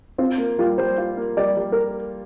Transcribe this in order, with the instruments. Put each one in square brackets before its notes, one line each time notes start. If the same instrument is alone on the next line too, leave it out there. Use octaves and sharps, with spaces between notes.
[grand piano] C4 [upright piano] F4
[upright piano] A#3
[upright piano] G3 [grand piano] F4
[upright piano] G3 [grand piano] C5
[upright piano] F4
A#3
[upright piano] G3 [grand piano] D5
[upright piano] G3
[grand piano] A#4